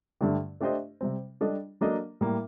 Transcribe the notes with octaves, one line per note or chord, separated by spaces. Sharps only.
G2 D3 A3 D4 G4
A3 D4 G4 C5 D#5
C3 G3 C4
G3 D4 A4 D#5
F#3 A#3 D4 A4 D#5
A2 G3 A#3